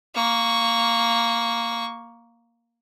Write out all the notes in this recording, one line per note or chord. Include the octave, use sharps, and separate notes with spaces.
A#3 C#6